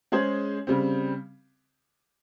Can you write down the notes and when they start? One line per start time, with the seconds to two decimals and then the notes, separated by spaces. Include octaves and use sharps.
0.12 G#3 C#4 G#4 C5
0.67 C#3 G3 C4